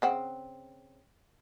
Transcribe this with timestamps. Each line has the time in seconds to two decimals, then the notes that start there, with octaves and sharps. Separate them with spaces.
0.02 C#3 C4 F#5